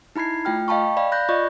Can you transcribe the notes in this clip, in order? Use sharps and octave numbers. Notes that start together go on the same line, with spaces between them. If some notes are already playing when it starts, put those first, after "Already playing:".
D#4 E4 B5 G#6 C7
A3 F4 G5 F6
D#5 F5 G5 A5 B5 C#6
D5 F5 B5
B5 F#6 G6 A#6
F4 D5 D#5 C#6